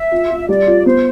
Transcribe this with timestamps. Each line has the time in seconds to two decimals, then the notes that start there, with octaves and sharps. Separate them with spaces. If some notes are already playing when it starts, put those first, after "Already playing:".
Already playing: E5
0.11 F4
0.30 F4
0.49 G3 D5
0.67 F4
0.86 B3 C5